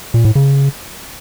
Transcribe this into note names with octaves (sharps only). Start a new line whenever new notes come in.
A#2
A2
C#3